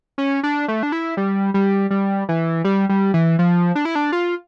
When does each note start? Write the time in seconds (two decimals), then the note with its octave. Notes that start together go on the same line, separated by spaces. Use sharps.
0.18 C#4
0.43 D4
0.68 A3
0.83 D4
0.92 E4
1.17 G3
1.54 G3
1.91 G3
2.29 E3
2.64 G3
2.89 G3
3.14 E3
3.39 F3
3.75 D4
3.85 E4
3.95 D4
4.12 F4